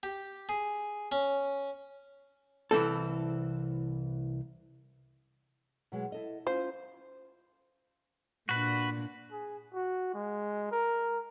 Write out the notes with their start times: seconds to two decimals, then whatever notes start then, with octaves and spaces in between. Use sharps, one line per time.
0.03 G4
0.49 G#4
1.12 C#4
2.71 C2 E3 C4 A4
5.92 B2 F#3 G#3
6.12 E4 A4 D#5
6.47 C#4 F4 C5
8.49 A#2 D4 F#4 B4
9.31 G#4
9.74 F#4
10.14 G#3
10.71 A#4